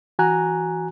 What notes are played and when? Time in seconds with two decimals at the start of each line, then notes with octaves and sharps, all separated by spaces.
0.19 E3 F#4 G#5 A#5 F#6